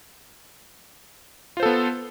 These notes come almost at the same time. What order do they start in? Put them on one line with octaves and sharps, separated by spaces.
F4 C5 A4 B3